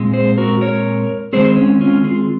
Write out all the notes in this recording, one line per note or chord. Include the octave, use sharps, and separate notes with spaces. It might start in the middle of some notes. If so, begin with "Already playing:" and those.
Already playing: A#2 G#3 C4
G#4 C5
F#4 A#4
A#4 C#5
D#3 G#3 C4 G#4 C5
C#4
C#4 F4
F4 G#4